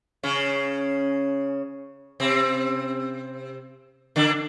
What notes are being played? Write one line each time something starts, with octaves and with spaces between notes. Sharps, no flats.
C#3 C#4
C3 C4
D3 D4